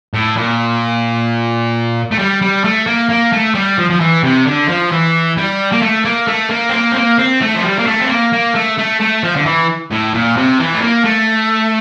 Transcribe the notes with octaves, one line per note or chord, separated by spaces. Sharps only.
A2
A#2
A3
G3
G3
A3
A#3
A#3
A3
G3
F3
F3
E3
C3
D3
F3
E3
G3
A#3
A3
A#3
A3
A#3
C4
A#3
C4
A#3
C4
A3
F3
G3
A#3
A3
C4
A#3
A#3
A3
A3
A3
F3
D3
E3
A2
A#2
C3
E3
A3
A#3
A3